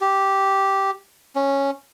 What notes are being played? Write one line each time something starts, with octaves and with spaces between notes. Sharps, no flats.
G4
C#4